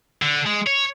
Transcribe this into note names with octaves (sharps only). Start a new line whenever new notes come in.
D3
G#3
C#5